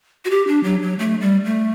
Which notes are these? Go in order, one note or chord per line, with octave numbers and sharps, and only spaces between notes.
F#4
G4
D4
F#3
F#3
A3
G3
A3